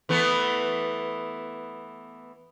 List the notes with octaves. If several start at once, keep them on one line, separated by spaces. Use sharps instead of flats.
E3 A3 B3